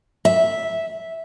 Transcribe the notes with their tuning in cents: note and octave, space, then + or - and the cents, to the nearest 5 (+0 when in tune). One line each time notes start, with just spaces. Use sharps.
E5 -10